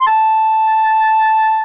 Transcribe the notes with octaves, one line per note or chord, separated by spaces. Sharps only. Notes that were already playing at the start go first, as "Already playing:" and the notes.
C6
A5